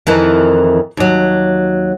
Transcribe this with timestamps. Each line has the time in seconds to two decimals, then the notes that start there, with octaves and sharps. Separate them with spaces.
0.07 F2 D#3 E3
0.97 D#2 F#3